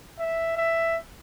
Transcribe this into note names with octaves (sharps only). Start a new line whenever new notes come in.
E5
E5